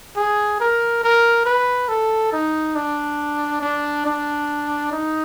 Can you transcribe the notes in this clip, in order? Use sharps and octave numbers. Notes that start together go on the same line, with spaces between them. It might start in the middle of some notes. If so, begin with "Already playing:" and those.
G#4
A#4
A#4
B4
A4
D#4
D4
D4
D4
D#4